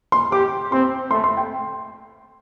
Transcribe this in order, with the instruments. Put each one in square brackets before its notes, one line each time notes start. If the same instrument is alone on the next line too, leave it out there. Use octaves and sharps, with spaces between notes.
[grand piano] C6
[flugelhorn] G4 [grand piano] D6
[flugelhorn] C4 [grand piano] C6
[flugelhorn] A3 [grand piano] C6
[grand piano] C6
G5